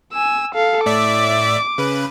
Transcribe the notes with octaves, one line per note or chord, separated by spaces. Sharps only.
G#5 E6
A4 F5
A2 D5 E5 D6
C#3 B4